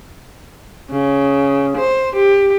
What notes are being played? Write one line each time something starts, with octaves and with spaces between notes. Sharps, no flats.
C#3
C5
G4